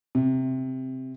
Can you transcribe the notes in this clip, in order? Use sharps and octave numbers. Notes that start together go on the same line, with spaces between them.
C3